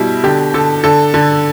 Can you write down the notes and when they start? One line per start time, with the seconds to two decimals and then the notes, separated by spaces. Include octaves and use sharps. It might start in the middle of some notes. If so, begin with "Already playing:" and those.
Already playing: B2 G3 E4
0.23 D3 G4
0.54 D3 A4
0.84 D3 A4
1.14 D3